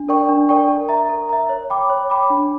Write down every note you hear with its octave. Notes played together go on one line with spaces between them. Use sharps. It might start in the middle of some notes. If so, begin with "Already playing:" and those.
Already playing: D4
A#4 D5 G5 C#6
D4
A#4 D5 G5 C#6
A#4
E5 A#5
A#4
E5 A#5
C#5
G5 B5 D6
C#5
G5 B5 D6
D4